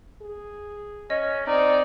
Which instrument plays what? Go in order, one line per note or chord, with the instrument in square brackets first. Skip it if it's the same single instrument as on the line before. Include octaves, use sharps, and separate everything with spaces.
[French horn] G#4
[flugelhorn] C#4 [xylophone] D#5
[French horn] C4 [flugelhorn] D#4 [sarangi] D5